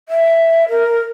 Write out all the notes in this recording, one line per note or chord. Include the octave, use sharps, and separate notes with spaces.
E5
A#4